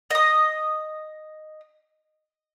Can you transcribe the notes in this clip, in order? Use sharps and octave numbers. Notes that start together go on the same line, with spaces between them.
D#5 D#6